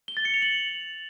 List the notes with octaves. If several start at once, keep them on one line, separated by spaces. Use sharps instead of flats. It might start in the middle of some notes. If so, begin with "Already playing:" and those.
G7
A6
C#7
F7
F#7